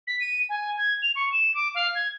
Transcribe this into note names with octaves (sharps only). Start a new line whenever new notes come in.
B6
D#7
G#5
G#6
F7
C#6
E7
D6
F5
G#6